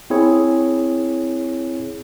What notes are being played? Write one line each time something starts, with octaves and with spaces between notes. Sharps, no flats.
C4 E4 G#4 C#5